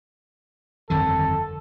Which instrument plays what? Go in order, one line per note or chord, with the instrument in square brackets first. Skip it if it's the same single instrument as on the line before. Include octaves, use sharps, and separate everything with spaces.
[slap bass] G1 F2 D#3 [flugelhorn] A4